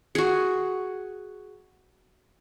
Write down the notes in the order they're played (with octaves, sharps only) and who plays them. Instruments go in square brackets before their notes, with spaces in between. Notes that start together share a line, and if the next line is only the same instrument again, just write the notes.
[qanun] F#4 G#4